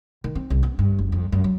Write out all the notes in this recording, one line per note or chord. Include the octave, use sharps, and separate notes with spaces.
D#3
C4
C2
B3
G2
F#1
F2
F#2
F#3